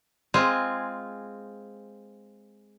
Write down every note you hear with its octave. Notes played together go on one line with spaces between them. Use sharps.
G#3 C4 F4 G#5